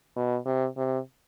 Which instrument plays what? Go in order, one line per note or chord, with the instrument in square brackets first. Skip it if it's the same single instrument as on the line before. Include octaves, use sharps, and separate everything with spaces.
[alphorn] B2
C3
C3